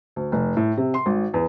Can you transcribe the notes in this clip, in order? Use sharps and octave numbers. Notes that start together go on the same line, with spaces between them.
D2
F1
A2
C3
C6
G#1
E2